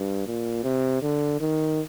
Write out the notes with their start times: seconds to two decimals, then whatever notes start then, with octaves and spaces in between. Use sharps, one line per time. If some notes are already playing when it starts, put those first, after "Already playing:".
Already playing: G2
0.27 A#2
0.64 C3
1.02 D3
1.41 D#3